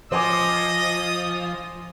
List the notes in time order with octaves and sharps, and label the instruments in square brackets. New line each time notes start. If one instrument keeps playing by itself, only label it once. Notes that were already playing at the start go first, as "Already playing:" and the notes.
[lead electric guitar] F3 [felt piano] C5 G#5 D6 [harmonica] D#5 [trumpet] D#6